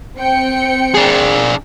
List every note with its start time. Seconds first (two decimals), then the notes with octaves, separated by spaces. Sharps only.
0.17 C4 G5 C#7
0.95 D4 G#4